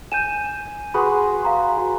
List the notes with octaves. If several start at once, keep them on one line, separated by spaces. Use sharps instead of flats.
G#5 G6 D#7 E7
F#4 G#4 B4 B5 C6
F5 A#5 C6
F#4